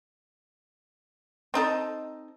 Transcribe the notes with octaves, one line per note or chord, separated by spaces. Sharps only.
C4 D#4 A4 D#5